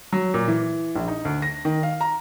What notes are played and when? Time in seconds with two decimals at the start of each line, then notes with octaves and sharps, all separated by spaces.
0.13 F#3
0.34 A#2
0.48 E3
0.96 A#1
1.08 D#4
1.25 D2
1.42 A#6
1.65 D#3
1.83 F5
2.01 A#5